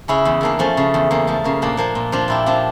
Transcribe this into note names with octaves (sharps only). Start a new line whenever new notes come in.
C#3 C#4 E4
E2
E2 A#3 D4
F3 A3 C#4
C#3
E2
E2 A#3
F3 A3
C#3 A#3
A#2 A#3 D4
F3 A#3 D4
A#2
F3 D4 F4
A#2 E4 G4
F3 D4 F4